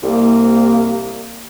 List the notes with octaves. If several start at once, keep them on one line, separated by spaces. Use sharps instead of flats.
C2 A#3